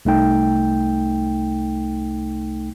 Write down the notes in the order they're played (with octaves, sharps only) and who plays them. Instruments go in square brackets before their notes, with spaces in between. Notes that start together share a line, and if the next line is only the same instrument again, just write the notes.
[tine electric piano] C2 A3 D#4 G5